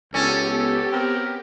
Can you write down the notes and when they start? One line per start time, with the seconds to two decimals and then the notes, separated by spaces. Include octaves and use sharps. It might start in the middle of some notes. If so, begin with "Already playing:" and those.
0.14 C#2 B3 C#4 G4 A4
0.50 A4
0.92 C4 A#4